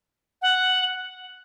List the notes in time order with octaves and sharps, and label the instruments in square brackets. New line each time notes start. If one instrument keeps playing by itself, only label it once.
[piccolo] F#5